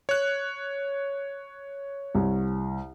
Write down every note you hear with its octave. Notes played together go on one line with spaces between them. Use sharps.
C#5 F#6
C2